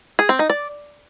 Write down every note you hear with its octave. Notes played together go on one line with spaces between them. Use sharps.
G#4
C4
D#4
D5